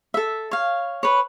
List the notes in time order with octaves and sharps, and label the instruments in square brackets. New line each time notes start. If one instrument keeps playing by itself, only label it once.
[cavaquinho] A4 E5
C#5 F5
B4 C#5